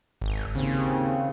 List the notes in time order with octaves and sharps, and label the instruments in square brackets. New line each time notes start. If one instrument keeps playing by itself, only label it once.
[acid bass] G#1
[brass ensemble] D#2 C4 [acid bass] C#3